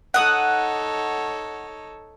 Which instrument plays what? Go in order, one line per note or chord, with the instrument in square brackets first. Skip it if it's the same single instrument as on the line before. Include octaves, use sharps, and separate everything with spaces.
[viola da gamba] D#4 A4 C#5 [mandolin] F#5 D#6